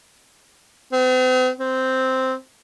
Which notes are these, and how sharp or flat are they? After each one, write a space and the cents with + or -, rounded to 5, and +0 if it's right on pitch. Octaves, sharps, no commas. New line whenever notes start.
C4 -45
C4 -5